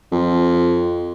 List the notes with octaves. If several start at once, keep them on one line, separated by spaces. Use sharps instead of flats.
F2